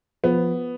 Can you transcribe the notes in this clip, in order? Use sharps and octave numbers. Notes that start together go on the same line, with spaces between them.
F3 B3